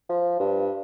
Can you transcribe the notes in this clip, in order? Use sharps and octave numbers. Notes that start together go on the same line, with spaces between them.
F3
G2